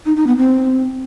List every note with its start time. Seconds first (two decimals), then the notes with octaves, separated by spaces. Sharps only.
0.06 D#4
0.16 D#4
0.27 B3
0.37 C4